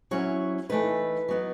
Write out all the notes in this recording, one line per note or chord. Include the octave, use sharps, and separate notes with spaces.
F#3 C#4 E4 C#5
E3 A3 D#4 B4
F#3 B3 D#4